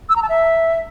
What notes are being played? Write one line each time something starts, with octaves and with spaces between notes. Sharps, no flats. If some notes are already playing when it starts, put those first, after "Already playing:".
E6
A#5
A5
E5